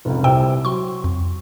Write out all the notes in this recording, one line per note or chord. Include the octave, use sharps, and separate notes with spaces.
F1 C#2
C2 C3 G5 E6
F#3 C6 C#6
F2